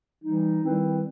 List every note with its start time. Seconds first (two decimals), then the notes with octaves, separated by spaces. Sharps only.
0.23 E3 G3 D#4
0.63 D#3 G3 C4 E4 B4